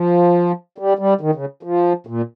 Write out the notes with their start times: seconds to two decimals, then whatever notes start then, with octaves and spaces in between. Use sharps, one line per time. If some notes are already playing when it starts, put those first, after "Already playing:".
Already playing: F3
0.78 G3
0.99 G3
1.21 D#3
1.35 C#3
1.63 F3
2.07 A#2